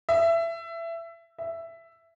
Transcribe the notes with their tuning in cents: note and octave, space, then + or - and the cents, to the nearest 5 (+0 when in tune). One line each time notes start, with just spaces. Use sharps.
E5 +20
E5 +10